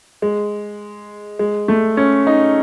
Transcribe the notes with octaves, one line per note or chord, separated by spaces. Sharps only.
G#3
G#3
A3
C#4
D#4